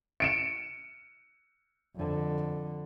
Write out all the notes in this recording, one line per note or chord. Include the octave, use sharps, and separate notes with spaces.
C#7 D7 E7
F2 D3